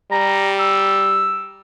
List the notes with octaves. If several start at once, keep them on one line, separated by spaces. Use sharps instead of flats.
G3 A#5
E6